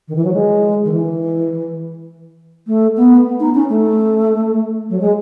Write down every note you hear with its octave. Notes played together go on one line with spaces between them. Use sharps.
D#3
E3
F#3
G#3
D#3
E3
A3
B3
D#4
C#4
A3
F#3
G#3